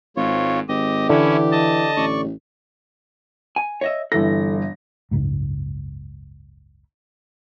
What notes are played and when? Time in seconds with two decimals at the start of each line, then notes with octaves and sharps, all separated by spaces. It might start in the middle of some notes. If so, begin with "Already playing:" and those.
0.16 G#1 G#2 F4 C#5
0.68 G#1 G4 D#5
1.09 D3 E3 C#4 E4
1.52 D#5 A5
1.97 A1 D5 C#6
3.56 G#5
3.81 C#5 D#5 E5
4.12 G1 E3 A4 A#6
5.11 F#1 C#2 G#2